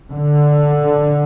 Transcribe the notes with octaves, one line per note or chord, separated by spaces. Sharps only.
D3